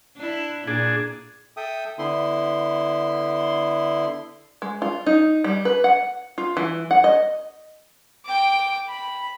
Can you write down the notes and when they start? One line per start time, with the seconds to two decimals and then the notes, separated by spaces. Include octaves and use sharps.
0.17 D4 E4
0.68 A#2 D4 G#4
1.57 A4 E5 G5 D#6
1.99 D3 B3 E4 C6
4.62 G#3
4.82 F4
5.06 D#4
5.44 G3
5.65 B4
5.84 F#5
6.38 F4
6.57 E3
6.91 F#5
7.04 D#5
8.25 G5 D6
8.88 B5